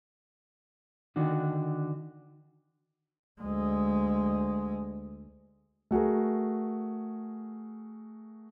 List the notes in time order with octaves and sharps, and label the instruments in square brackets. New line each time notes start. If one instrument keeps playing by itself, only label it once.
[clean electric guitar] D3 D#3 D4 F#4
[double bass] D2 G#3
[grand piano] A3 F#4 G#4 A#4